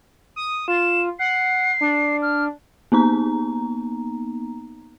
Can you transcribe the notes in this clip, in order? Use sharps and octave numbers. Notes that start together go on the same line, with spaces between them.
D#6
F4 E7
F#5 C7
D4
F6
A#3 B3 D#4 A#5